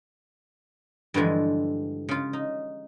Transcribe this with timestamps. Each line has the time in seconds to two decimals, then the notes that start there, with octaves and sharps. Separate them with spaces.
1.14 G2 D3 E3 F3 G#3
2.09 C#3 F4
2.33 D#4